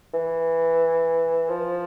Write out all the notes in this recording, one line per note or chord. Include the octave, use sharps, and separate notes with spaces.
E3
F3